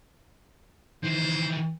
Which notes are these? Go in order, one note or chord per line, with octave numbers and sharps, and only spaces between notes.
D#3 E3 C5